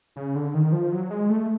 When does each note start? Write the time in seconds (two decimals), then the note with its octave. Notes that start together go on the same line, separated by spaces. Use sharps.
0.16 C#3
0.36 D3
0.54 D#3
0.72 F3
0.92 F#3
1.10 G#3
1.30 A3